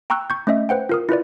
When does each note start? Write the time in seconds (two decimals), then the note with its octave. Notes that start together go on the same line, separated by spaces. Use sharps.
0.10 G5 A#5 C#6 E6 F#6
0.30 C#6 G6
0.47 A3 C#4 D#5 E5
0.69 B4 C5 F#5 G5
0.89 F4 A#4 D#6
1.09 E4 F4 B4 D5